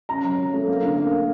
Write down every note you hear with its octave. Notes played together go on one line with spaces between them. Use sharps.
F#2 A#5
F#3
F#3
A3
A#3
D3
A#3